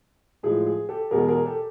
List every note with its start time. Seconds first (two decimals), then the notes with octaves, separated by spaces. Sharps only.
0.43 A2 F3 G#3 G#4
0.66 G#4
0.89 G4 A4
1.11 E2 B2 G#3 G#4 A#4
1.28 G#4 A#4
1.45 G4 A4